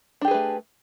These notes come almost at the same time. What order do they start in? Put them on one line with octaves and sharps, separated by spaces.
D4 G4 G#4 B4 A3